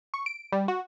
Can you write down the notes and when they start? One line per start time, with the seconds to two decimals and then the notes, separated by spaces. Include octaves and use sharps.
0.14 C#6
0.26 D7
0.52 G3
0.68 F#4